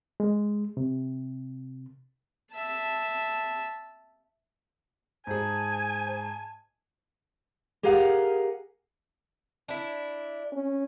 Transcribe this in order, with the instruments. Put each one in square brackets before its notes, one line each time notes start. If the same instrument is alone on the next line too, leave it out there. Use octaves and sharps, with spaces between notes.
[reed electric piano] G#3
C3
[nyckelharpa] E5 A5
[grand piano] G#2 G#4 [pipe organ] C5 [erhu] G#5 [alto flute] A5
[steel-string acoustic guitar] G4 G#4 A#4 F5 F#5 G#5
[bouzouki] D4 E4
[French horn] C#4